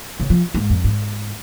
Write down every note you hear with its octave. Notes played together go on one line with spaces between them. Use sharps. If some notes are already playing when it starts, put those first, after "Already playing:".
C#3
F3
G#2
F2
G#2